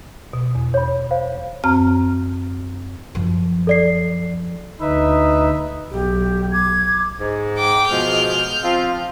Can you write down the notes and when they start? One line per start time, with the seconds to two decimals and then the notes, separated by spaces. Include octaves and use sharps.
0.33 B2
0.55 E2
0.74 C#5 B5
1.11 C5 F5
1.64 F#2 C4 A#5 F6
3.15 F#2 F3
3.67 A4 D5 C7
4.81 D2 D#4 B4 E5
5.91 B1 G4
6.52 D6 G#6
7.19 G#2
7.58 G5 D6
7.89 B2 F3 G#3 F6 G6
8.63 F3 C4 F4